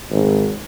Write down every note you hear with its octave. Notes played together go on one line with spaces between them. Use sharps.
G#1